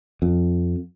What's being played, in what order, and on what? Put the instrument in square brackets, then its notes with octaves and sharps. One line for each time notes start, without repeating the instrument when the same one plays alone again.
[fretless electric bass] F2